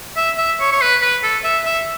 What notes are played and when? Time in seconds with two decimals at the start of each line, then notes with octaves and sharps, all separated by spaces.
0.17 E5
0.38 E5
0.60 C#5
0.72 C#5
0.81 B4
1.02 B4
1.23 A4
1.44 E5
1.65 E5